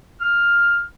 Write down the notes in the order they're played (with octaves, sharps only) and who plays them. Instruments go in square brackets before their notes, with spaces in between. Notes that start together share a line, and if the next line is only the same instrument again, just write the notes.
[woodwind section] F6